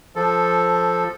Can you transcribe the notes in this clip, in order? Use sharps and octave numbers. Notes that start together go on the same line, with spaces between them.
F3 A4